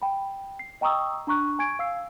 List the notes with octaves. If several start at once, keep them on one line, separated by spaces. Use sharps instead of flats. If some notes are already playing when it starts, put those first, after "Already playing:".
G5 B5
C7
D#5 G5 A#5 C#6 D#6 E6
D4 A#5 C#6 F#6
G#5 C#6 G#6 D7
F5 E6 C7